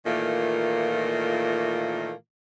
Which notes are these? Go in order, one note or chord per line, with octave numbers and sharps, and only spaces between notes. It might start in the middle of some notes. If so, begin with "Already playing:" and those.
A#2 D#3 E3 A3 A#3 F4